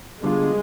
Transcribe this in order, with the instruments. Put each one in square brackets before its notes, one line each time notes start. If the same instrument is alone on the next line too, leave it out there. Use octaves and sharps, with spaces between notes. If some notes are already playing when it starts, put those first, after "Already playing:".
[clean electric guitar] D3 G3 B3 F4 [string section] G#3